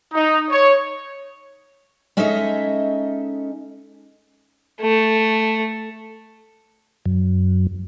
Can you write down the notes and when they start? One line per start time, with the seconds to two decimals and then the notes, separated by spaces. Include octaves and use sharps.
0.13 D#4
0.50 C#5
2.17 G#3 C#4 D#4 A4 D#5 E5
4.81 A3
7.06 F#2